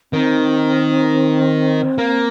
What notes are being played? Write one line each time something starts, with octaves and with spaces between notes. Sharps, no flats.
D#3 C4
A#3